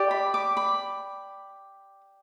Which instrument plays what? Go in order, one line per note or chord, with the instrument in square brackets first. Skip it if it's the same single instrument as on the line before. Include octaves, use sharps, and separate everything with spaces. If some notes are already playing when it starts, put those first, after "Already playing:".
Already playing: [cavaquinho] G4 D5
B5
D6
B5